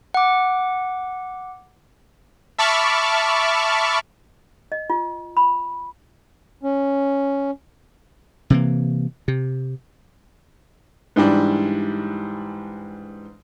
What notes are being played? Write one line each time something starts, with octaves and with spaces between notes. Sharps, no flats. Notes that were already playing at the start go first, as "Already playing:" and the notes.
F#5 D6
E5 A5 B5 C#6 D6 F6
D#5
F4
B5
C#4
C3 E3 A#3
C3
G#2 E3 G3 D4